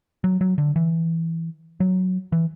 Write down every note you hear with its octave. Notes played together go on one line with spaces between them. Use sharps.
F#3
F#3
D3
E3
F#3
E3